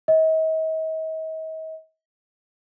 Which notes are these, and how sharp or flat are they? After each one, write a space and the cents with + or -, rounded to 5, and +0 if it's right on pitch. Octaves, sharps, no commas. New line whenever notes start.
D#5 +40